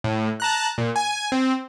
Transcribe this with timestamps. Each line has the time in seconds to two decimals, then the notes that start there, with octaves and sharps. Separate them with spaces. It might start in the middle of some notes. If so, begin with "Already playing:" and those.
0.04 A2
0.40 A5 A#5 F#6
0.78 A#2
0.96 G#5
1.32 C4